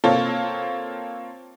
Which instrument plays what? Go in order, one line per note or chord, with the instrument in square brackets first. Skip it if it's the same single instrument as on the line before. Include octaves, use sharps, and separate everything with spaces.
[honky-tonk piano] A#3 C4 F4 A4 C#5